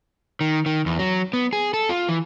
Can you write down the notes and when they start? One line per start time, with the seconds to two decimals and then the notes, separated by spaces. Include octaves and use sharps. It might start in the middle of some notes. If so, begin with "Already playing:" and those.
0.41 D#3
0.66 D#3
0.86 E2
0.99 F#3
1.33 B3
1.53 G#4
1.74 A4
1.89 F4
2.08 E3